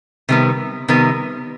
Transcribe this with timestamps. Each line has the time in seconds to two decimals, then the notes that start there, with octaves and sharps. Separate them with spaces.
0.29 C3 D#3 G3 B3
0.88 C3 D#3 G3 B3